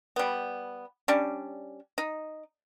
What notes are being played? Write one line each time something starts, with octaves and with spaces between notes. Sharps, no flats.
G3 B3
G3 C#4 D4
D#4